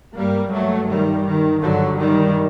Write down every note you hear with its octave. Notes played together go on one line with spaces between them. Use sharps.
G2 G3 A#3
F#3 A3
D#3 G3
D#3
G2 D3 F#3
D#3 G3